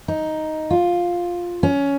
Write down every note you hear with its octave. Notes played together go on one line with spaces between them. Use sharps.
D#4
F4
C#4